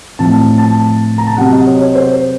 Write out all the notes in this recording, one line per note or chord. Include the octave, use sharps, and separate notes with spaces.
A2 F3 C4 A5
A5
A#5
A5
C3 F#3 C4 F#5
D#5
C#5
C#5
C5